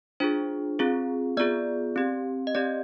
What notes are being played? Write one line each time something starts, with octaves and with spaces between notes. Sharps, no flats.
D4 F4 G#4 C5
C4 F4 G#4
B3 F4 G#4 D5
C4 G4
D#5
C4 G4 D5